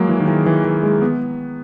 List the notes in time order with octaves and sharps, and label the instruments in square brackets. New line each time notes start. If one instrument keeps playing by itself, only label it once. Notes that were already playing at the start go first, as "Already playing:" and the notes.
Already playing: [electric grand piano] F#3 G#3 A#3
E3
D#3
E3
E3
E3
G#3
B3